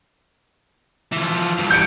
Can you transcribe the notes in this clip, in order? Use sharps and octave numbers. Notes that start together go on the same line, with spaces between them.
E3 F3
G2 E3
G6 C#7 D7